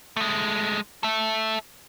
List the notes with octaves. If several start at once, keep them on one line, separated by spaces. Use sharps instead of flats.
G#3 A3
A4 E5